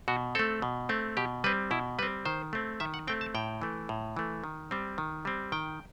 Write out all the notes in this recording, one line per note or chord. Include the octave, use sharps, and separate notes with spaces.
B2 F#4
A3 C4 A4
B2
A3 C4
B2 G4
G3 C4 B4
B2 E4
G3 C4 B4
D#3 C5
A3 C4
D#3 E5
F#5
A3 C4 G5
A5
A2 G5
E3 A3
A2
E3 A3
D#3
G3 C4
D#3
G3 C4
D#3 G5